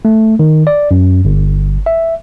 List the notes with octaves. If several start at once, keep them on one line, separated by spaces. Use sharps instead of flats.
A3
D#3
D5
F#2
G1
E5